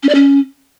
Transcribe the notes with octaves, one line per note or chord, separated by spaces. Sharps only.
C#4
D5
C#4